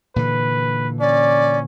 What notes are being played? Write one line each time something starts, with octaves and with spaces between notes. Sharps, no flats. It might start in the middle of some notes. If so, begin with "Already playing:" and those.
A#2 D3 E3 B4
C#4 D5